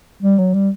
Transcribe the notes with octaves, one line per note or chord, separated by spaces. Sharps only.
G3
F#3
G3